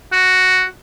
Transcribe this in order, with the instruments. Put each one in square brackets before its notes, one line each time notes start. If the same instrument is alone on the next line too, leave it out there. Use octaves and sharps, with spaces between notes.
[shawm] F#4